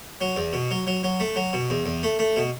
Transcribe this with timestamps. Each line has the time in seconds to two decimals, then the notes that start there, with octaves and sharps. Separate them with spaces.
0.21 F#3
0.36 E2
0.53 B2
0.71 F#3
0.87 F#3
1.03 F#3
1.20 A3
1.36 F#3
1.53 B2
1.70 E2
1.86 E2
2.03 A3
2.19 A3
2.36 B2